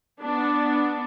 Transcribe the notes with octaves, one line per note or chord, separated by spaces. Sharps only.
B3 D4